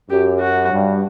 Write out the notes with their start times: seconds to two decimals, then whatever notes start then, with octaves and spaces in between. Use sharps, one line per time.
0.09 F#2 G4
0.39 F#4
0.70 G2